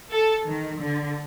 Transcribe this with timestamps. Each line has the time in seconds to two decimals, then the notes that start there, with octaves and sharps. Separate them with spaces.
0.10 A4
0.48 D#3
0.81 D3